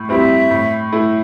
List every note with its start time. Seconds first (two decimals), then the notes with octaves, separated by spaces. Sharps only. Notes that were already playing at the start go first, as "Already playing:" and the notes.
Already playing: A2
0.09 G3 C4 E4 E5
0.51 A2
0.93 A3 E4